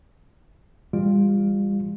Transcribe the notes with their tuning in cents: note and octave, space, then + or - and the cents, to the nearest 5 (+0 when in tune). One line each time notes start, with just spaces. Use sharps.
E3 +40 G3 +35 F4 +0